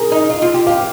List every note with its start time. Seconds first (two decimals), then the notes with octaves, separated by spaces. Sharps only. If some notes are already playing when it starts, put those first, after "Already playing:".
Already playing: G#4 A#4
0.12 D#4
0.30 F4
0.42 F4
0.54 G4
0.66 G4 F5